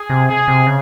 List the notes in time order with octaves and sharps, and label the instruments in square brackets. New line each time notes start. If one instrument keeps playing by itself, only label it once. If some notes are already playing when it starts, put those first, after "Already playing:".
Already playing: [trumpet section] G#4
[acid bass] C3
[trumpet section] G#4
[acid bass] C3
C#3